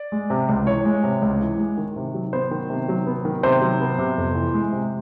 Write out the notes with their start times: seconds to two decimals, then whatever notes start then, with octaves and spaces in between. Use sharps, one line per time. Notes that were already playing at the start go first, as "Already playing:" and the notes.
Already playing: D5
0.12 G#3
0.30 C3
0.49 C#2
0.67 E3 C#5
0.85 G#3
1.03 C3
1.22 C#2
1.41 E3
1.59 G#3
1.78 D#3
1.96 C3
2.14 F#3
2.33 B3 C5
2.51 D#3
2.70 C3
2.89 F#3
3.07 B3
3.25 D#3
3.43 C3 C5
3.62 F#3
3.80 B3
3.99 C3
4.18 F2
4.35 E3
4.54 G#3
4.73 C3